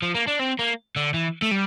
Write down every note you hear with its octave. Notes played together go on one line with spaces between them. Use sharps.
F3
A#3
D4
C4
A#3
D3
E3
A3
G3